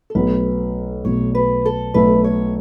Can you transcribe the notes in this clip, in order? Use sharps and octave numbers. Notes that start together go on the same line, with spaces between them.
A4
B1 B2 A3 B4
B1 B2 A3 C#5
B4
A4
B1 B2 A3 B4
C#5